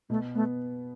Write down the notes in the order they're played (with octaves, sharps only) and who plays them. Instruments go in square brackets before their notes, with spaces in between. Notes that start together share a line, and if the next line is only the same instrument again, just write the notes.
[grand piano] B2 [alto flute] A3
[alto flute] A3 [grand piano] B3